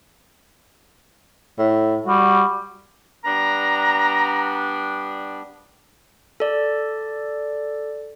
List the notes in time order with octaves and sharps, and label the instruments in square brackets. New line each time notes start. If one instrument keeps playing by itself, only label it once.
[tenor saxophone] A2
[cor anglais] G3 [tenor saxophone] F#4
[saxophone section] G3 B3 D4 [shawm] A#5
[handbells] A4 D5